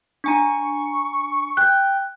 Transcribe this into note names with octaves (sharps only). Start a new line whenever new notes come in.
D4 G#5 A#5 C#6
G5 F#6